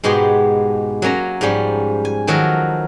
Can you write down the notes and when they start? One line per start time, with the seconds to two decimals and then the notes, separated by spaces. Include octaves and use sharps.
0.04 G#2 B2 G#3 B3 G4 C6
1.02 F#3 A#3 C#4 A#5
1.41 G#2 F3 G3 C#4
2.05 G#5
2.27 D#3 F3 F#3 F#4 A4 A#4